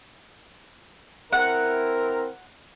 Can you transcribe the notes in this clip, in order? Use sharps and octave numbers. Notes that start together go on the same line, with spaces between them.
C4 E4 A#4 F#5